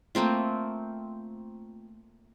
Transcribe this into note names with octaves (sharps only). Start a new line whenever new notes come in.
A3 A#3 C4 F4